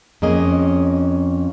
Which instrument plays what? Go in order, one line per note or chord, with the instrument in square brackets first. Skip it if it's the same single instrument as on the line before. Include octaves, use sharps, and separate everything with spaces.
[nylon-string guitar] F2 A#3 C#4 G#4 D#5